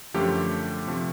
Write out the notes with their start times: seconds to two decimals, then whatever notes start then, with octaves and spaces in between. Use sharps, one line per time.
0.14 F#2 D3 F3 A3 G4
0.87 C3 F3 A3